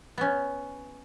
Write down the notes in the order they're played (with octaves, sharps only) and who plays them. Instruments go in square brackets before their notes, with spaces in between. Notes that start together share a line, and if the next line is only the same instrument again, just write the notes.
[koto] B3 C#4